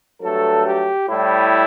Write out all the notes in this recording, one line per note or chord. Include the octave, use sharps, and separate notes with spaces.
G2 F#3 A3 A4
G4
A2 G3 E4